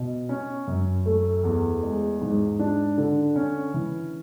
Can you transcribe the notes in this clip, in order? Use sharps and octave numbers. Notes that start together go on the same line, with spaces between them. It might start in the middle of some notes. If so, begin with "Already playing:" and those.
Already playing: B2
C#4
F#2
A3
E2
G#3
G#2
D4
D3
C#4
E3